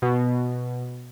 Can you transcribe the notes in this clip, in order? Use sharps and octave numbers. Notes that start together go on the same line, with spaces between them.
B2